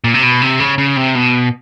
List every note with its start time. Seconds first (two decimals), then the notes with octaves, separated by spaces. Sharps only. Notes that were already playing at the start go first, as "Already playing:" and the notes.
0.04 A#2
0.14 C3
0.23 B2
0.42 C3
0.60 C#3
0.78 C#3
0.96 C3
1.15 B2